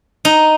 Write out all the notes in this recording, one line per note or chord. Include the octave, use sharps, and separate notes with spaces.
D#4